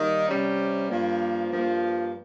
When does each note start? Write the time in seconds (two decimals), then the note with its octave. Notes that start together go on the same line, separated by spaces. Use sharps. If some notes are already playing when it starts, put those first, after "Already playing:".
Already playing: D#3 G3 A#3 D#4
0.28 C3 G3 C#4
0.89 G2 F3 A#3
1.51 G2 F3 A#3